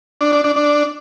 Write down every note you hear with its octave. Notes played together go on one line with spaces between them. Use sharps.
D4
D4
D4
D4